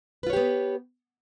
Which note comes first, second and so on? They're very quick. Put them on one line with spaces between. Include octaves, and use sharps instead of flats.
B4 F4 C#5 G4 B3